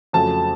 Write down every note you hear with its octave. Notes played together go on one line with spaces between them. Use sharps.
F2 C#3 F#3 A3 A5